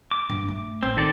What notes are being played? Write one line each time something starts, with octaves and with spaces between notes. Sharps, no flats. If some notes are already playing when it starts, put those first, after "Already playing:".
D6
G2
A3
A1 C4
D#3 A4 D5